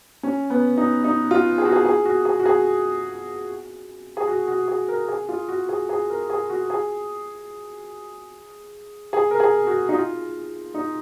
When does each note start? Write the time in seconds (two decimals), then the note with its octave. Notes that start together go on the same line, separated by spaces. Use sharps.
0.23 C#4
0.50 B3
0.77 D#4
1.04 D#4
1.31 F4
1.58 G#4
1.65 F#4
1.72 G#4
1.85 G#4
2.05 F#4
2.25 G#4
2.39 F#4
2.46 G#4
4.17 G#4
4.28 F#4
4.48 F#4
4.68 G#4
4.88 A#4
5.08 G#4
5.29 F4
5.48 F#4
5.69 G#4
5.89 G#4
6.10 A#4
6.30 G#4
6.50 F#4
6.70 G#4
9.13 G#4
9.31 A#4
9.40 G#4
9.67 F#4
9.89 D#4
9.94 F4
10.74 D#4